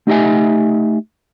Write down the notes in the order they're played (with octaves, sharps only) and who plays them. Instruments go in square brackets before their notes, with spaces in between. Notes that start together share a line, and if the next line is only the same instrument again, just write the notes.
[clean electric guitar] A3 D#4 G4 D#5 E5 G#5